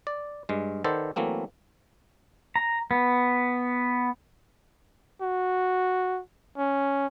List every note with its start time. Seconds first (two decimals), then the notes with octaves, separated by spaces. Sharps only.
0.07 D5
0.49 G2 G#3
0.84 D#3 A4 B4 C5 D5 F#5
1.16 E3 F#3 A3 A#3 C4
2.56 A#5
2.91 B3
5.22 F#4
6.58 C#4